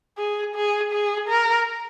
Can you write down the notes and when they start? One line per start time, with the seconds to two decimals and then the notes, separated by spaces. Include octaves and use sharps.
0.18 G#4
0.55 G#4
0.92 G#4
1.29 A#4